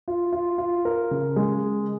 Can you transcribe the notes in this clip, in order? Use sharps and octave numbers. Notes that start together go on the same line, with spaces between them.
F4
F4
F4
A#4
C#3
G#3